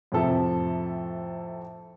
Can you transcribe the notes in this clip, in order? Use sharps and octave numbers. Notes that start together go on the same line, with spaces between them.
F2 A2 C3 F3 A4 E5